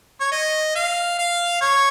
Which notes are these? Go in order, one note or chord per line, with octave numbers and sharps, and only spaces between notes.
C#5
D#5
F5
F5
C#5